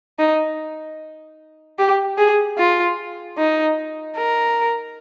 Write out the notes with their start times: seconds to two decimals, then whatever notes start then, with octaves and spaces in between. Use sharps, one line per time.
0.19 D#4
1.78 G4
2.18 G#4
2.58 F4
3.38 D#4
4.17 A#4